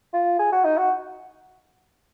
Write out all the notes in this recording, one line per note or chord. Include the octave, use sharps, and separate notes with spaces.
F4
G#4
F#4
D#4
F#4